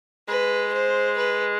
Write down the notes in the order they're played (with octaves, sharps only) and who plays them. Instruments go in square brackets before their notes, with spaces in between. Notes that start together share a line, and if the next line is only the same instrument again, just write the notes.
[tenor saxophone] G#3 [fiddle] B4
[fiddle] C5
B4